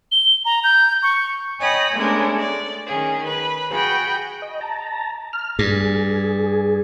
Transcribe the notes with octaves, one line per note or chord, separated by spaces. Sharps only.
G7
A#5
G6
C#6
C#5 D#5 G5 G#5 B5 D#6
G#3 A3 B3 C#4 D4 A#4
D5
D#3 C#4 G#4
B4 B5
F#4 G#4 G5 B5
D#5
A5 A#5
F6
G2 G#4